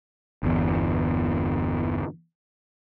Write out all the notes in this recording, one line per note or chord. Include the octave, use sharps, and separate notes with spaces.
G1 E2